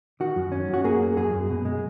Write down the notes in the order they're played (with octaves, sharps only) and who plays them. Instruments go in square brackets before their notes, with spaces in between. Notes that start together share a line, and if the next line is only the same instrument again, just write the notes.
[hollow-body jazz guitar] D#3 F#4
F#2
C#4
F#2
F#4
A#3 G#4
A#3
F#2 G#4
F#2
B2
G#3